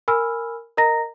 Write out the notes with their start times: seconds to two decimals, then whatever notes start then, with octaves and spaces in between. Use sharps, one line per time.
0.08 A#4 G#5 B5 E6 F6
0.77 A#4 D#5 A#5 A#6